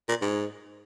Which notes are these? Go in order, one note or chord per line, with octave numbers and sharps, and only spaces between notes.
A#2
G#2